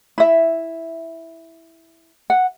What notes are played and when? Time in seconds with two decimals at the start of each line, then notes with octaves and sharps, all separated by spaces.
0.18 E4 E5
2.30 F#5